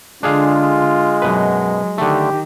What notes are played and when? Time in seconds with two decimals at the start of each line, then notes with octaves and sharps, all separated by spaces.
0.23 D3 G#3 D4 F4 G#4 F5
1.22 F#2 B2 F#3 B4
1.98 D3 D#3 A3 G4